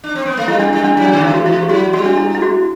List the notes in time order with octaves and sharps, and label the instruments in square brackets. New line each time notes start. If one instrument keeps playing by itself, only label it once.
[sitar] D4
C4
B3
A3
[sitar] G3 [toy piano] E4
[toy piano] D4
[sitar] G3 [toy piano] E4
[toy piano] D4
[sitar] F#3 [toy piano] E4
[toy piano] D4
[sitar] D3
[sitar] E3 [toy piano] E4
[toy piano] F#4
[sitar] E3 [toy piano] E4
[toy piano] G4
[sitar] F#3 [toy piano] F#4
[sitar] G3 [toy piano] F#4
[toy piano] D4
E4
E4
F#4